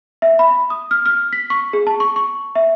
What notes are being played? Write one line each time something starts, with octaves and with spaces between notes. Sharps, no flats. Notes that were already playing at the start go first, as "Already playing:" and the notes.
E5
B5
D#6
F6
F6
B6
C#6
G#4
A5
C#6
C#6
E5